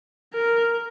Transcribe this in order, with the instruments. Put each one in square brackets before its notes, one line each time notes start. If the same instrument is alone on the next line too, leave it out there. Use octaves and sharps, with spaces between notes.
[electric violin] A#4